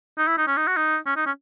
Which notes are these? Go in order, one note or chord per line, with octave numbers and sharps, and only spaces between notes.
D#4
E4
D#4
C#4
D#4
F#4
D#4
C#4
D#4
C#4